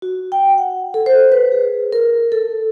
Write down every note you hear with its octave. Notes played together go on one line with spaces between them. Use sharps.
F#4
G5
F#5
A4
C5
B4
G#4
A#4
A4